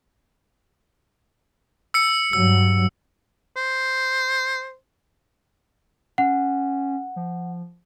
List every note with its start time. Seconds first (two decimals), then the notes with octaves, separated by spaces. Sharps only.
1.94 E6 C#7
2.33 G2 F#3 E6
3.56 C5
6.18 C#4 F#5
7.16 F3